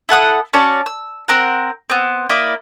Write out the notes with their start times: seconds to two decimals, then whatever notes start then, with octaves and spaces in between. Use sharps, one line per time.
0.09 E4 A4 F#5 D#6
0.53 C#4 F#4 D5 A5
0.86 E6
1.28 C4 A#4 F#5
1.90 B3 C4
2.29 A#3 E4 D5 D#5